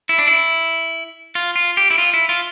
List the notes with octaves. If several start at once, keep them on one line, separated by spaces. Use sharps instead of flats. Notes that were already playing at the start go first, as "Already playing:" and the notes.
E4
D4
E4
F4
F4
G4
E4
F4
E4
F4